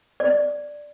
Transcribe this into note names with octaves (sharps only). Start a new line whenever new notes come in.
D5